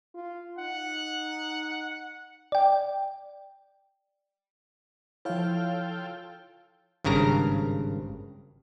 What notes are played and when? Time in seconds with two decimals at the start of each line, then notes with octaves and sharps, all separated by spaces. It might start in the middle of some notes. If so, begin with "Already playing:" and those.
0.15 F4
0.59 D#4 F#5
2.52 D5 G5
5.25 F3 E4 F4 A4 C#5 F5 G5
7.04 G#1 G2 C#3 A#4 A#5